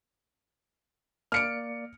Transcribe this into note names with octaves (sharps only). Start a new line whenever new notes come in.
A#3 D5 F6 C#7 D7